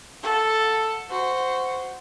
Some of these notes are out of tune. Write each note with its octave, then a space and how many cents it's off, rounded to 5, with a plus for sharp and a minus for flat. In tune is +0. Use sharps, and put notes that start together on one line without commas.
A4 +0 F#5 -15
F#4 +0 C5 -15